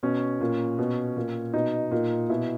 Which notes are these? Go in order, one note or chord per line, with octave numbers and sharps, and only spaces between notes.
B2 C#4
A#2
B2
A#2
B2 D#4
A#2
B2 E4